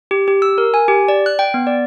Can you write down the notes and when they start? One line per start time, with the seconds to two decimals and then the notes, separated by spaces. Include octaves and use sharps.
0.11 G4
0.28 G4
0.42 E6
0.58 A#4
0.74 G#5
0.88 G4
1.08 D5
1.26 F#6
1.39 G5
1.54 B3
1.67 D5